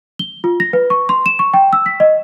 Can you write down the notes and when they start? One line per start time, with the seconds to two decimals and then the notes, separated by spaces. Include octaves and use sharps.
0.19 G7
0.44 F4
0.60 A#6
0.73 B4
0.90 C#6
1.09 C6
1.26 E7
1.39 C#6
1.54 G5
1.73 E6
1.86 B6
2.00 D#5